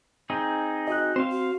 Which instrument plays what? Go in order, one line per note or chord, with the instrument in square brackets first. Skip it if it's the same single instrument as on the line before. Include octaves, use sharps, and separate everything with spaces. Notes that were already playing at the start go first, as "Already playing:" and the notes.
[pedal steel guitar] C4 D#4 G#4
[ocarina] F#4 [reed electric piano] D#5 F#6
[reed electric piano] C4 [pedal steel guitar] C5 F5
[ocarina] F#4